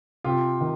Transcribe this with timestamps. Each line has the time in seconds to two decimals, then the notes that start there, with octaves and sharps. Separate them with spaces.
0.24 C3 F4 G4
0.61 D#3